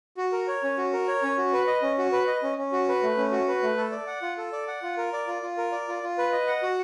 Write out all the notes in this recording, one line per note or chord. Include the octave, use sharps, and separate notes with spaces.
F#4
A#4
C#5
C#4
F#4
A#4
C#5
C#4
F#4
B4
D#5
C#4
F#4
B4
D#5
C#4
C#4
F#4
B4
A3
C#4
F#4
B4
A3
A4
D5
F#5
F4
A4
D5
F#5
F4
A#4
D5
F4
F4
A#4
D5
F4
F4
B4
D#5
F#5
F#4